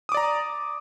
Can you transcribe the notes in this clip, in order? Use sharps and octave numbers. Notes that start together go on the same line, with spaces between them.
D5 A#5 D6 D#6